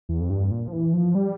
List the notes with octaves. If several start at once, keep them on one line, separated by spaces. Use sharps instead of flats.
E2
F2
G2
A#2
F3
E3
F3
G3